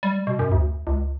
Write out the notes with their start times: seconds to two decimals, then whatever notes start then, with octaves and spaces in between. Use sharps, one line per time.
0.03 G3
0.27 B2
0.39 F#2
0.52 D2
0.87 C#2